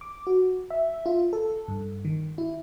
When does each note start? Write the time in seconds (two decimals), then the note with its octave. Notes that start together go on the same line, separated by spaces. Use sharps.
0.01 D6
0.27 F#4
0.70 E5
1.06 F4
1.33 A4
1.68 G2
2.05 D#3
2.38 E4